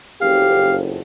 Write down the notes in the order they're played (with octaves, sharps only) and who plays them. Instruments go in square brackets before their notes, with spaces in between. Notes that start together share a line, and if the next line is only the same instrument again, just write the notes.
[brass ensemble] F#1 F2 [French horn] G4 [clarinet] F5